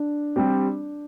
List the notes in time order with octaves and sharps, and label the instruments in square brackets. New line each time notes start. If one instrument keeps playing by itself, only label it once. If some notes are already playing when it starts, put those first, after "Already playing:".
Already playing: [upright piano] D4
[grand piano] G3 C4 G4